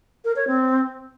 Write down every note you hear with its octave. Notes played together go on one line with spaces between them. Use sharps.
A#4
C#5
C4